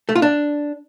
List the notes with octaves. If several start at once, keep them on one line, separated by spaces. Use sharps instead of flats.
A3
F4
D4